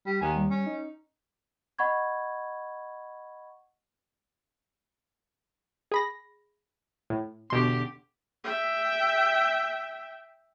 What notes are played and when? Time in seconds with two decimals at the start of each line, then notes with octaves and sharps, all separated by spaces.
0.06 G3
0.21 D#2 G#5
0.36 G3
0.50 C#4
0.66 D#4
1.79 D#5 F#5 B5 C#6 G#6
5.92 G#4 B5 A#6
7.10 A2
7.50 E2 B2 D3 G4 C6
8.44 E5 G5